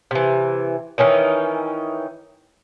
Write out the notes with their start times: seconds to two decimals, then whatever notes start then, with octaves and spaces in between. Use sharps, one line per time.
0.11 C3 E3
0.98 D#3 E3 C#4 D#4